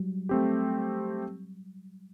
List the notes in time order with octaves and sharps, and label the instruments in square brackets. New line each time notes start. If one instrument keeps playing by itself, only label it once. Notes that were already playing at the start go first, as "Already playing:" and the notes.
Already playing: [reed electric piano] F#3 G3
[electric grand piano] A3 C4 G4